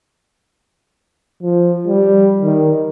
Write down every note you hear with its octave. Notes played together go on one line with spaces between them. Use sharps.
F3
G3
D#3